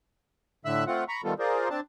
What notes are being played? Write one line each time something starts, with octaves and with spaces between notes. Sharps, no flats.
A2 D3 E5 E6 F#6
A3 C4 F4 F#5
A#5 B5 C#6
D#3 G3 A3 B3 F4 A4
F4 G#4 A#4 C5 D5
C4 D4 A5